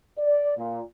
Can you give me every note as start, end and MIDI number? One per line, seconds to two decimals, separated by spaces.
0.18 0.55 74
0.57 0.81 46